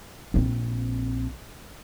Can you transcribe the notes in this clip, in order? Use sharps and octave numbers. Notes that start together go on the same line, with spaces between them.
A#1 C4